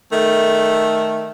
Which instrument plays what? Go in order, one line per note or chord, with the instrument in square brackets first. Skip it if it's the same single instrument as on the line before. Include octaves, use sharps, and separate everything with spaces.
[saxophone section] D#3 A3